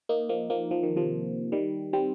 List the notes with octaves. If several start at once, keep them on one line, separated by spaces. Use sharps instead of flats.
A#3 D#4
F3 A#3
F3 A#3
F3
D#3
C3 F3
D#3 G3
G3 C4